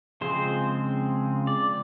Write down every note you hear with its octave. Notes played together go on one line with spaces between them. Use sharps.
C#3 F3 G#3 C4 C5
D5